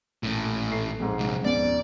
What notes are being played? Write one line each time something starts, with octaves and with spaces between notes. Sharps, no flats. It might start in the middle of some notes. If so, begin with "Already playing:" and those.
A#1 A2 C#4
A3 C7
F2 G#2
C3 G#3
D#1 B3 C#4 D5